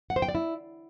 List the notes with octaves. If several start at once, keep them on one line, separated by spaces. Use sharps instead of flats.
F#5
C5
G5
D5
E4